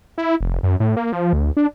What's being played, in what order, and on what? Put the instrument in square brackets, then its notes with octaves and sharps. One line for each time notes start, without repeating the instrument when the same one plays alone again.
[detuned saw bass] E4
F1
F#2
A2
A#3
F3
D2
D4